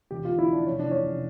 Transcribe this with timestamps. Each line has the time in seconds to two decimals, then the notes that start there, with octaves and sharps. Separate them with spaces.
0.11 E1 G4
0.25 D3 F4
0.39 E4
0.48 F3 D4
0.66 F1 C#4
0.79 D4
0.85 E3
0.91 C#4
1.03 F1